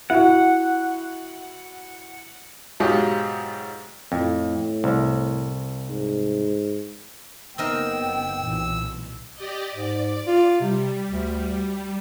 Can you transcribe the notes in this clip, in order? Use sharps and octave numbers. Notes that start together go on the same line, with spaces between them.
E4 F#4 F#5
G#2 B2 F#3 F4 G4 G#4
F2 A2
C2
G#2
F#1 B3 C4 D#4 A#4 G5 E6
B1 A#2 E3
G4 D5 D#5
G#2 D5
F4
C3 G3
D2